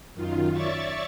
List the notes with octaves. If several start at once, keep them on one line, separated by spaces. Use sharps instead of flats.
F#2 D#3 F4
C#5 D5 E5 C#6 A6